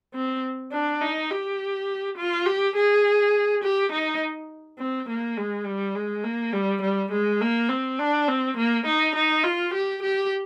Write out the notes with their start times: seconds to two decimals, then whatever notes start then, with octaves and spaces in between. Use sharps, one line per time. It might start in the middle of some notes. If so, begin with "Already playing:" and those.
0.14 C4
0.72 D4
1.01 D#4
1.30 G4
2.17 F4
2.46 G4
2.76 G#4
3.63 G4
3.92 D#4
4.79 C4
5.09 A#3
5.38 G#3
5.66 G3
5.95 G#3
6.24 A#3
6.53 G3
6.82 G3
7.12 G#3
7.41 A#3
7.69 C4
7.98 D4
8.28 C4
8.57 A#3
8.86 D#4
9.15 D#4
9.43 F4
9.73 G4
10.02 G4